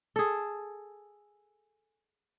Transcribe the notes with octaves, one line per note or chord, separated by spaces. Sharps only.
G#4 A4